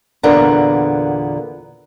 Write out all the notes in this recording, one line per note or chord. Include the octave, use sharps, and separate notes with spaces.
E2 A#2 D3 A#3 B3 A#5